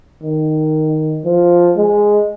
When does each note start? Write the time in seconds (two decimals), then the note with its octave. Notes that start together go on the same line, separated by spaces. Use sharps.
0.23 D#3
1.25 F3
1.77 G#3